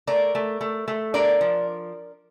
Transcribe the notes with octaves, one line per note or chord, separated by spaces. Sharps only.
A3 A#4 D5
A3
A3
A3
D4 A#4 D5
F3